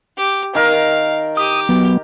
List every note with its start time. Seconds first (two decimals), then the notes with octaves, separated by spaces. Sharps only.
0.17 G4
0.55 D#3 A#4 F5
1.37 G4 D#6
1.69 F#3 B3